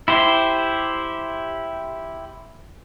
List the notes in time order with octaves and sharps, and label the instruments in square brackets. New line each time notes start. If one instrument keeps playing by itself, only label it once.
[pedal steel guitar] E4 G4 C5